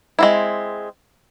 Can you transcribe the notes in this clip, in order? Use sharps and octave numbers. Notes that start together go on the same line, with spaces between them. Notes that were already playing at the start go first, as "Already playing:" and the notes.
G#3 C4 E4